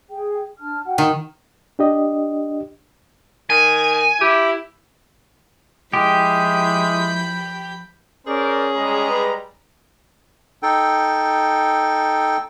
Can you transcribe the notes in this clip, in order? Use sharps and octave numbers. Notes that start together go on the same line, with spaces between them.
G#4 G5
D4 A5 F6
F#4 F#5 G5
D#3
D4 G4 D#5
D#3 G#5
E4 G4
F3 G#3 E4 G4 B5 G6
C#4 G#4 A#4 C5 D5
G3 G#3 A#5
B4
D#4 A4 G5